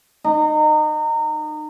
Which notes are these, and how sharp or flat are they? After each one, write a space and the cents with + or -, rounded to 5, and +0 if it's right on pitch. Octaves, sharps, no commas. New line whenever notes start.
D#4 -30